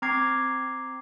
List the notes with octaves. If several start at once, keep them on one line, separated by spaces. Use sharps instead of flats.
C4 A#5 D6 G#6 C7